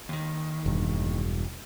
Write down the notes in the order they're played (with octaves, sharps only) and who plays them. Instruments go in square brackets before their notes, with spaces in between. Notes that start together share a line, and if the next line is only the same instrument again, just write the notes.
[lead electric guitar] D#2 D#3
[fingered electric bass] E1 G2